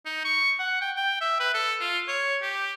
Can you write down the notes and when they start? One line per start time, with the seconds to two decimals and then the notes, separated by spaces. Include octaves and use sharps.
0.06 D#4
0.24 C#6
0.59 F#5
0.81 G5
0.96 G5
1.21 E5
1.40 B4
1.54 A4
1.80 F4
2.08 C#5
2.42 G4